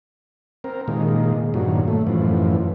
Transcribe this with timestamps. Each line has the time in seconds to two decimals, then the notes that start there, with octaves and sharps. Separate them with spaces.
0.64 C4 A#4
0.88 A#2 D#3 G#3
1.54 G2 A#2 D#3 F#3
1.88 A3
2.07 F#2 A2 E3 F3